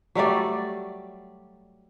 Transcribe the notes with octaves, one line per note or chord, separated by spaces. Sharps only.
F#3 G3 A3 D5